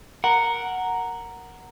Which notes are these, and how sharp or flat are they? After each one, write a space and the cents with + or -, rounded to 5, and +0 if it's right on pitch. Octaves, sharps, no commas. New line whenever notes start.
A#4 +0 F#5 +0